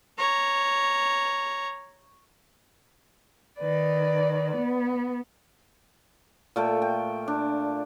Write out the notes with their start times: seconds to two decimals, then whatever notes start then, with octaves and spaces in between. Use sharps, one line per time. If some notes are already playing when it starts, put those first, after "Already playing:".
0.18 C#5 A#5
3.59 D#3 B4 D5
4.56 B3
6.56 A#2 A3 G5
6.82 G5
7.28 D4